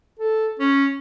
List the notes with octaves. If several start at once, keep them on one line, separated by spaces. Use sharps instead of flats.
A4
C#4